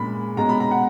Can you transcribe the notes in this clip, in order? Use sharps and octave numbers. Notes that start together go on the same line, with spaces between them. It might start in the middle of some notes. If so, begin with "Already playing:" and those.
Already playing: A#2 G#3 C#4 B5
B2 G#3 C#4 A#5
B5
A#5
F#5